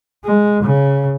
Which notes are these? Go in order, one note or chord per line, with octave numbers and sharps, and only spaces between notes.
G#3
C#3